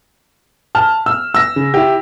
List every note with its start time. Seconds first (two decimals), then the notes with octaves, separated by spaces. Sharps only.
0.75 A5 F6
1.06 E6
1.34 E6 A#6
1.56 C#3
1.74 E4 G4